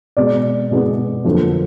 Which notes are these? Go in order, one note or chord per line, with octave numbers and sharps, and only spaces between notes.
B2 G#3 B3 D5
B2 G#3 B3
F2 D3 F#3 A#3